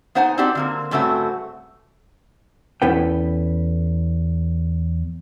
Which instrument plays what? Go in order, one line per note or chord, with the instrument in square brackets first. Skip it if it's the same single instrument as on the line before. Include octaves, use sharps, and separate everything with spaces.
[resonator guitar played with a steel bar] B3 D#4 C5 F#5 G#5
C4 D4 D#4 F#4 G4 D5
D3 A#3 C4
G2 C#3 A3 C4 F#4
[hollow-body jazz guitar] E2 C#4 E4 A4 B4 G5